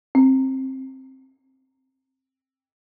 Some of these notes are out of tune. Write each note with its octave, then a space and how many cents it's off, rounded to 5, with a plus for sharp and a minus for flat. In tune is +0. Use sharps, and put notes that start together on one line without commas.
C4 +15